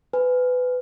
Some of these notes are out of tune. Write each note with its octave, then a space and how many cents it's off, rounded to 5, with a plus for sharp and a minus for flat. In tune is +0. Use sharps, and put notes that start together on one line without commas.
B4 +20 G#5 -5